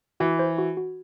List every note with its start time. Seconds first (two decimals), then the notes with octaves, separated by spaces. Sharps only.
0.20 E3 F#4
0.39 C5
0.58 F#4
0.77 F#4